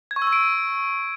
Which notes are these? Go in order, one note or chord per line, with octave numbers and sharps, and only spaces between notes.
G#6
C#6
E6
C#6
D7